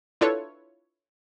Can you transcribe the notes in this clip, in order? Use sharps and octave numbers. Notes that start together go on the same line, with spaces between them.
D4 E4 F4 A4 B4 C#5